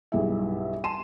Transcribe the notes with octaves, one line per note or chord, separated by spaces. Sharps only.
B1 G2 E4 G#4 E5
G#5 A5 C6 D#7 E7